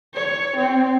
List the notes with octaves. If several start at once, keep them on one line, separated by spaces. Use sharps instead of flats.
C#5
C4